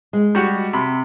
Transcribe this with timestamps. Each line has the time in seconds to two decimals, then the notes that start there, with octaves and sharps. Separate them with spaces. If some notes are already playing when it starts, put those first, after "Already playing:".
0.13 G#3
0.35 G3 F#4
0.73 C3 B5